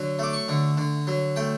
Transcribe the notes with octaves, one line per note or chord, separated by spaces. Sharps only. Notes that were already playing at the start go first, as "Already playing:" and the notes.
Already playing: D3 F#3
A3 D6
C#6
D3
D3
F#3
A3 G5